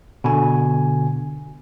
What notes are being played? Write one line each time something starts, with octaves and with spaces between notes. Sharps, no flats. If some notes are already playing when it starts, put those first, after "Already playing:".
B2 D3 G#5